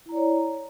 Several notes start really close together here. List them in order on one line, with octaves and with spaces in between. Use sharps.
E4 A#5 D5 C#5